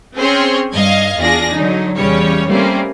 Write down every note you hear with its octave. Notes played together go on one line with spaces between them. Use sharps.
C4 C#4 G#4 C5 C#5 C6
G2 D#5 F5 G#6
E2 D4 F4 G#4 A#6
D3 F#3 D#4
E2 C#3 G3 C#4 C#5
G3 A3 A#3 C4 C#4